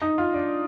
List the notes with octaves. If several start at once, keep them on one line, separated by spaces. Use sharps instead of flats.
D#4
F4
D4